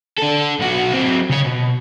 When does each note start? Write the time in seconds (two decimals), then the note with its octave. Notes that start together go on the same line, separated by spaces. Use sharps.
0.18 D4 A4
0.59 B1 F#4
0.92 F#3 C4
1.30 C#3 C#5
1.45 B2